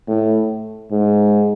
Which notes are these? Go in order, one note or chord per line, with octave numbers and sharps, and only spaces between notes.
A2
G#2